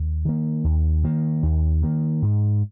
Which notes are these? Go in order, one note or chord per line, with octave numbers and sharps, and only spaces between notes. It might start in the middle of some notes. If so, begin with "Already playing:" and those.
Already playing: D#2
D#3 A#3
D#2
D#3 A#3
D#2
D#3 A#3
G#2